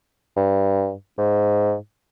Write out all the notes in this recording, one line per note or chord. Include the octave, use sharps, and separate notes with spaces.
G2
G#2